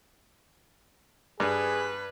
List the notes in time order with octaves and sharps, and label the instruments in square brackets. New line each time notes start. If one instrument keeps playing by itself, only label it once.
[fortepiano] G2 [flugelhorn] G#4 [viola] B4